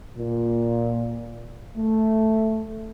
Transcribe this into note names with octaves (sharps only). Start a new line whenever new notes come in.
A#2
A3